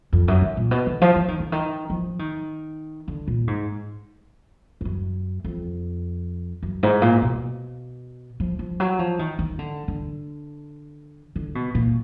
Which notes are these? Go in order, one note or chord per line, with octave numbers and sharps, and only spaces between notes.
F2
F#2
D#3
A#2
B2
D3
F3
F3
D#3
D3
D#3
F3
D#3
D3
A#2
G#2
F2
F#2
F2
F#2
G#2
A#2
B2
F3
F3
F#3
F3
D#3
D#3
D3
D3
D3
B2
A#2